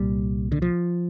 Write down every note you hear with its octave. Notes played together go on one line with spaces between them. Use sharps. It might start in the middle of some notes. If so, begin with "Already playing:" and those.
Already playing: C2 A#2 G3
D3
F3